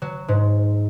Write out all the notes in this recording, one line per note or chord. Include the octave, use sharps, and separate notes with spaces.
F#3
G#2